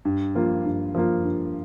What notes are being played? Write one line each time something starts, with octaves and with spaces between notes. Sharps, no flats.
G2
F3 A#3 F4
G2
F3 A#3 F4
G2